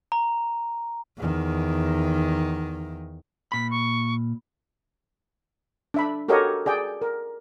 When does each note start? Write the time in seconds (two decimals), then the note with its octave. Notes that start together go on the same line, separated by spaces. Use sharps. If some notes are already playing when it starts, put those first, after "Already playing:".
0.12 A#5
1.18 E2 D#3
3.52 A#2 B5 B6
3.71 C#6
5.94 D4 E5 B5
6.28 F#4 G4 A4 A#4 C#5 D#5
6.66 G#4 D5 G5
7.01 A#4